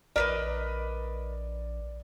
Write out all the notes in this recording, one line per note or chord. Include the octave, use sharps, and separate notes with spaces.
A#1 A#4 B4 D5 D#5